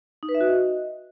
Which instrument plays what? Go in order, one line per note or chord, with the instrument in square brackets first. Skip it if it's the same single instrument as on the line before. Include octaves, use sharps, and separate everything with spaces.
[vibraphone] D#4
B4
E5
F#4
D#5